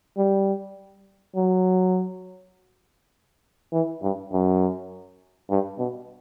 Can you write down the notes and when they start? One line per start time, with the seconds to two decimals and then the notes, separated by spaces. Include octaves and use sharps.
0.17 G3
1.36 F#3
3.72 E3
4.02 G2
4.32 F#2
5.50 G2
5.79 B2